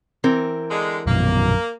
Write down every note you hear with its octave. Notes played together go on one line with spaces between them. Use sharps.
E3 C4 A#4
D3 G#3
A#1 F#2 B2 A#3